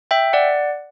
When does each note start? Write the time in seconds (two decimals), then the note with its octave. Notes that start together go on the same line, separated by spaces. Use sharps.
0.11 E5 G5
0.33 D5 F#5